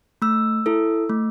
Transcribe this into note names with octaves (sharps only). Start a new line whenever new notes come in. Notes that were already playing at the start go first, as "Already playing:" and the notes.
A3 E6
E4 A4
A3